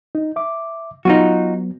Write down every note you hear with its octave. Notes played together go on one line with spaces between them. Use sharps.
D#4
E5 D6
F#3 B3 D#4 F4 F#4